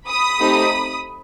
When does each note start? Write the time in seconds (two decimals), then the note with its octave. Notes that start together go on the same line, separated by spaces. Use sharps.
0.09 B5 D#6
0.40 A3 C4 D#4 G4